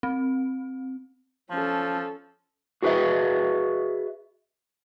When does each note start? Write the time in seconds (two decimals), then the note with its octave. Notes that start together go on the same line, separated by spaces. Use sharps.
0.03 C4
1.51 F3 C#4 A4
2.82 F#4 G#4 B4 D#5 E5